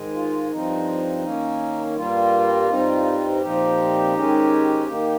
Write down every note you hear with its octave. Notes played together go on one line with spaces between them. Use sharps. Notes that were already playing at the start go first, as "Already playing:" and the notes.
Already playing: G#2 D#3 G#3
F4
G2 F3 C4 D#4
D#3 A#3 C#4
G2 G3 A#3 F4
G2 G3 C4 D#4
A#2 F3 C4 D#4 G4
G#2 D#3 G#3 C#4
D#3 A#3 D#4